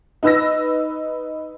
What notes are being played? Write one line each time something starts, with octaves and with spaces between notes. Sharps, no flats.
D#4 B4 E6 A#6